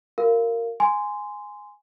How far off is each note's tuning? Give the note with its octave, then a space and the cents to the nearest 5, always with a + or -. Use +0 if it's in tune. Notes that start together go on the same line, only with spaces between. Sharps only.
F#4 +0 A#4 -15 F5 -15
G#5 +0 C6 -15